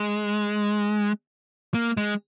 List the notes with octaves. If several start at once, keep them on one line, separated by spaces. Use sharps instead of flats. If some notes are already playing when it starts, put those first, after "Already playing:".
Already playing: G#3
A#3
G#3